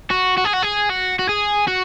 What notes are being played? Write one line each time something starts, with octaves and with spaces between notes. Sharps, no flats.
F#4
F#4
G#4
F#4
G#4
F#4
F#4
G#4
F#4